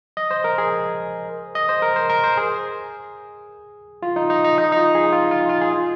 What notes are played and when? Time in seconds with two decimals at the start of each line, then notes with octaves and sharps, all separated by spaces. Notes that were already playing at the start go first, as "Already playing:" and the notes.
0.17 D#5
0.31 C5
0.44 A#4
0.58 G#4
1.55 D#5
1.69 C5
1.82 A#4
1.96 C5
2.10 A#4
2.24 C5
2.37 G#4
4.03 F4
4.16 D#4
4.30 D#4
4.44 D#4
4.58 D#4
4.72 D#4
4.76 F4
4.95 G#4
5.12 F4
5.31 F4
5.49 F4
5.61 G#4
5.73 F4